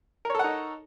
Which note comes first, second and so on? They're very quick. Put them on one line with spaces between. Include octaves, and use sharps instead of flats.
A#4 C#5 A4 F#5 D#4